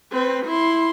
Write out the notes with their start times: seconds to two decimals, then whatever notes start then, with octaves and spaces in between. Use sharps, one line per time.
0.12 C4 B4
0.46 E4 C6